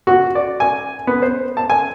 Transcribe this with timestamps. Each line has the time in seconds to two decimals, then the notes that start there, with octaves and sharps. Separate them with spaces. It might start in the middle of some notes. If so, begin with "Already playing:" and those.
0.07 F#4
0.35 D5
0.60 G#5
1.07 B3
1.22 C5
1.57 A5
1.70 G#5